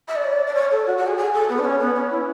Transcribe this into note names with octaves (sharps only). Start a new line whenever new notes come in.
E5
D5
C#5
D5
D5
C#5
A4
F#4
F#4
G#4
G#4
A4
B3
D4
C#4
B3
C#4
E4